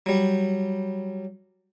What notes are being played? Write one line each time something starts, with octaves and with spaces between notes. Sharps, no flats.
F#3 G3